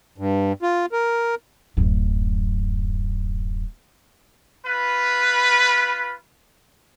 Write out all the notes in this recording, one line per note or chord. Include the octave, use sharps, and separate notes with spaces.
G2
F4
A#4
D1 F#2
F4 B4